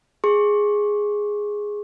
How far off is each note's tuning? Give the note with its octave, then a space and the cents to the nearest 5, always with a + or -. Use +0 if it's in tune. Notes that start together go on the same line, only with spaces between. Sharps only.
G#4 +0 C#6 -40